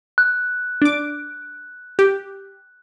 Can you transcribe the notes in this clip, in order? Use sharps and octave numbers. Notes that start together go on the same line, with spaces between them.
F#6
D4 D6
G4